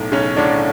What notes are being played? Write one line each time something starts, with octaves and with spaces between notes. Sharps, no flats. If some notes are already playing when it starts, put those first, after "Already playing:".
Already playing: B1 A2
B1 C#3 C#4
A2 D3 D4